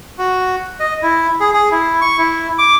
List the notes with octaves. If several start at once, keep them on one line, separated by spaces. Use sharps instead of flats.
F#4
D#5
E4
G#4
G#4
E4
C#6
E4
D6